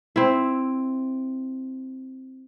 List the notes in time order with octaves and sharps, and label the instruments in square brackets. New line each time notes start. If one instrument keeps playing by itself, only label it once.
[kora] C4 E4